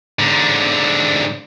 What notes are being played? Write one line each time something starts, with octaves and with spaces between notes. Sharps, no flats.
G#2 D3